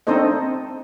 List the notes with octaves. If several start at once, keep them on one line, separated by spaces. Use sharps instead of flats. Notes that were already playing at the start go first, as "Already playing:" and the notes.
C4 D4 D#4 A4 C5 D#5